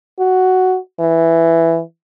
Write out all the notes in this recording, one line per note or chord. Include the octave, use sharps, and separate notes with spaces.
F#4
E3